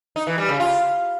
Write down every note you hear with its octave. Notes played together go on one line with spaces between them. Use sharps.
D#4
E3
G3
C#3
F4